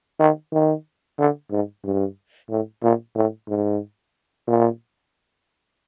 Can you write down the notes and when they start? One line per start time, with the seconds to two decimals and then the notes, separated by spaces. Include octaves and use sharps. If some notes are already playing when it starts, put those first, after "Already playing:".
0.20 D#3
0.53 D#3
1.19 D3
1.51 G#2
1.84 G2
2.50 A2
2.83 A#2
3.16 A2
3.49 G#2
4.48 A#2